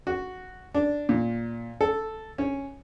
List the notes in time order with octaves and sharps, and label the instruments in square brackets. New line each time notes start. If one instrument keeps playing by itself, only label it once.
[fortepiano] F#4
D4
A#2
A4
C#4